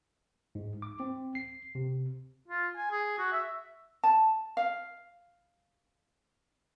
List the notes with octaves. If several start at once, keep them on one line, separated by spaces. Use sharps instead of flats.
G#2
D6
C4
C7
C3
F4
G#5
G#4
F#4
E5
A5
F5